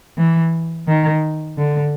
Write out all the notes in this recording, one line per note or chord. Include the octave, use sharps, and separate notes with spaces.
E3
D#3
D3